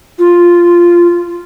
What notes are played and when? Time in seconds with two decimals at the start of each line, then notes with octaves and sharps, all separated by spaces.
0.19 F4